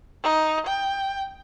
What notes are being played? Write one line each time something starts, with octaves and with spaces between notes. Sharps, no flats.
D#4
G5